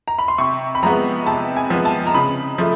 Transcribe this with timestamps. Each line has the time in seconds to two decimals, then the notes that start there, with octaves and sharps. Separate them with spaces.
0.08 A#5
0.19 B5
0.28 C6
0.38 C3 C#6
0.75 B5
0.83 F3 G#3 B3 A#5
1.26 C3 A5
1.57 G#5
1.70 F3 G#3 B3
1.85 A5
2.07 A#5
2.14 C#3 B5
2.58 F3 A3